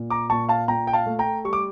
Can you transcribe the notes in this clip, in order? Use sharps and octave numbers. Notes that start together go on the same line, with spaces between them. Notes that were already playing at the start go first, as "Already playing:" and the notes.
Already playing: A#2
A#5 D6
A#2 A5 C#6
F5 A5
A#2 G5 A#5
G5
F5 A5
A3
G5 A#5
G3 C#6
D6